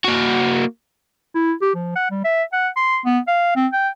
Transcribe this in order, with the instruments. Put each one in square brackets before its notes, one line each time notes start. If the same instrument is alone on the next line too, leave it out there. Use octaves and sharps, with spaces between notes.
[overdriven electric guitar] A#3 F#4
[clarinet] E4
G4
F3
F#5
G3
E5
F#5
C6
B3
F5
C4
G5